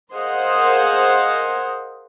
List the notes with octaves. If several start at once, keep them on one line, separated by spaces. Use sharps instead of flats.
G#4 A#4 C5 D#5 F5 F#5